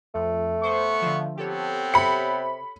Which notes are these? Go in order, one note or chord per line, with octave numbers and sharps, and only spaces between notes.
F2 A3
B3 C5 C#6
D3 F3
B3 C4 G4 A4 C#5
C3 B5 C#7